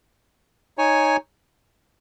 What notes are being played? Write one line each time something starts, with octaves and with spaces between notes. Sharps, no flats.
D#4 C#5 G#5